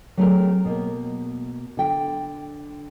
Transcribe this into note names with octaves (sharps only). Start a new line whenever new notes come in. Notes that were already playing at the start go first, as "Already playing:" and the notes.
F#3 A3 C4 G4 G#4 A#4
B2 A#3
D3 G5